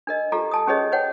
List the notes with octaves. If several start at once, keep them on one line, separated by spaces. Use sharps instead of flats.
D4 A#4 D#5
F4 G4 A4 A#5
G#5 A5 D#6
C#4 G4 G#4 B4 C#5 D#5
B4 C#5 F#5 G5